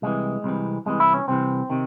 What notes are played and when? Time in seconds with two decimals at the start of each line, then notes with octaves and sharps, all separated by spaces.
0.02 C2 C3 E3 G#3
0.44 C2 C3 E3
0.86 C2 C3 E3 G#3
1.00 E4
1.14 C#4
1.28 C2 C3 E3 C4
1.70 C3 D#3